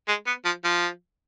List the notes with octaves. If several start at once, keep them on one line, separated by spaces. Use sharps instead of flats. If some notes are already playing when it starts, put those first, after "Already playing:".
G#3
B3
F3
F3